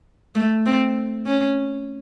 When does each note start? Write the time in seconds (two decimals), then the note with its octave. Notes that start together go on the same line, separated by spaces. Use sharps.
0.35 A3
0.66 C4
1.27 C#4